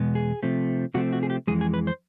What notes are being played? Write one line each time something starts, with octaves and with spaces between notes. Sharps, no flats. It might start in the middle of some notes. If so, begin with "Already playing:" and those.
Already playing: E2 B2 G#3 B3
G#4
C3 F3 A3 C4
C3 F3 A3 C4 F#4
F#4
G#4
G4
F2 C#3 E3 G#3 G#4
G#4
B4
C5